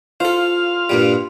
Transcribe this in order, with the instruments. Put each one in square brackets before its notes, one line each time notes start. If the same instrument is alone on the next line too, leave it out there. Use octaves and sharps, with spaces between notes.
[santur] F4 [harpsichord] A4 C5 [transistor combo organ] F5
[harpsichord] G2 A#2 G3